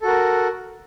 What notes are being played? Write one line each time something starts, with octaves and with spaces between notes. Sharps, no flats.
F#4 A4 A#4